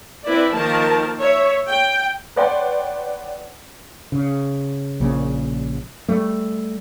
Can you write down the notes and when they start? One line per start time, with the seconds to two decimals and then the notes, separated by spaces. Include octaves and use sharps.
0.24 C4 E4 B4 D5
0.53 D#3 F3 A#3 A#4 A5
1.18 C#5 E5
1.69 G5
2.36 B4 C#5 D5 F#5 G5 C6
4.12 C#3
5.00 A#1 A#2 C#3 A#3
6.08 G3 A3